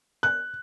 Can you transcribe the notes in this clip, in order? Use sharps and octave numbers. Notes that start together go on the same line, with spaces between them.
F#6